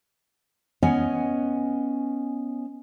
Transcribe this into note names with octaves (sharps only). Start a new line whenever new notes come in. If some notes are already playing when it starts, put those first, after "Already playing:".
B3 C#4 D#5 G#5